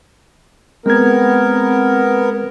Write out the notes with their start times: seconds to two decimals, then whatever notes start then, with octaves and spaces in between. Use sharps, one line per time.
0.86 G#3 B3 C4 A#4 G#6